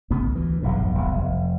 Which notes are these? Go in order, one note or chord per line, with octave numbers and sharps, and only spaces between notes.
C2 A2 C#3 B3
D2 E3
F1 B1 E2 G#2
D1 C2 F#2 B3
F1